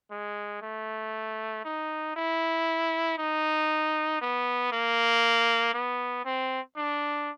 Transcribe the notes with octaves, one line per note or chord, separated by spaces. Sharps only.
G#3
A3
D#4
E4
D#4
B3
A#3
B3
C4
D4